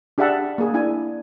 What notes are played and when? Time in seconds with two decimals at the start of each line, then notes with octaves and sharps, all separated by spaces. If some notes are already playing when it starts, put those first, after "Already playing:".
0.18 D4 G4 G#4 E5 F#5 A5
0.58 A#3 G#4
0.74 D4 E4 G#5